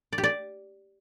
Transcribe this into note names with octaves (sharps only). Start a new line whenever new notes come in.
D5
G4
D5